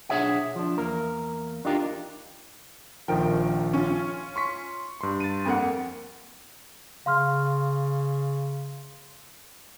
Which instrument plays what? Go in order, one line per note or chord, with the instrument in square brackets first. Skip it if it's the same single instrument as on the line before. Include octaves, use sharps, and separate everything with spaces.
[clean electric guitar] B1 D4 G#4 C#5 E5 F#5
F3 D4
E2 A#3 A#4
D4 D#4 F4 G4 A#4
[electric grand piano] A#1 D#3 F3 [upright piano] A#4 G5
[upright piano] C#4 F4
[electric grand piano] C6 C#6 B6
G2 C6
[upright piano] A6 D#7
F2 A#3 F#5
[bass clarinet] C#3 [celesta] F5 C6 F6